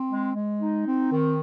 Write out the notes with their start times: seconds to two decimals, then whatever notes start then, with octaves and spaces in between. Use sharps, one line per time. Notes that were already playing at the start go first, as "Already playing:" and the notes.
Already playing: C4
0.10 G#3
0.35 G#3
0.61 D#4
0.86 C4
1.12 D#3